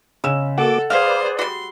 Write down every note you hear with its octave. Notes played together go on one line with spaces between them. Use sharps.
C#3 G#3 E6 E7
A#3 F#4 A4 F#5 D6
G#4 B4 C5 D5 F5
G3 F#4 C6